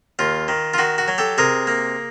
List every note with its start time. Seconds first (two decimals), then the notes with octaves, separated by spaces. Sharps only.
0.19 D#2 F4
0.48 D#3
0.74 F4
0.78 D#3 F#4
0.98 F#4
1.08 F#3
1.18 G4 A4
1.38 C3 G#4 A#4
1.67 A#3